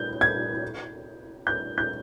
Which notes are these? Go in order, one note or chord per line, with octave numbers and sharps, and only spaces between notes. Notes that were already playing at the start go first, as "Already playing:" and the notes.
Already playing: G6
G#6
G6
G6